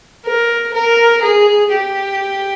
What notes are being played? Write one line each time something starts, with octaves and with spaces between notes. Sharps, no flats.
A#4
A#4
G#4
G4